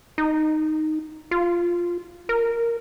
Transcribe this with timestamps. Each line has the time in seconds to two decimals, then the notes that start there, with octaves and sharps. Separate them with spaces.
0.18 D#4
1.31 F4
2.29 A#4